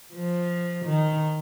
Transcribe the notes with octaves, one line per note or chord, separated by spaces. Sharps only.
F3
D#3